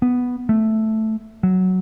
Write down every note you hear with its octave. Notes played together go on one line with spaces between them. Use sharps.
B3
A3
F#3